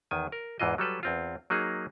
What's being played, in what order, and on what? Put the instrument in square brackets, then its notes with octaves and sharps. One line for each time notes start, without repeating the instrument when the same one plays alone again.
[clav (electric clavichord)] E2 D#3 G#5
A#4
E2 G#2 E3 F4 D#5
F#3 G3 A4 B4
E2 C4 F4
F#3 A#3 D#4 G#4